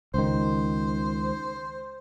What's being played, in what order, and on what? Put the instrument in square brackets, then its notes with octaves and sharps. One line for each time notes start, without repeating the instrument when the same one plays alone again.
[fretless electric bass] C#2 D#3 [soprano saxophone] C5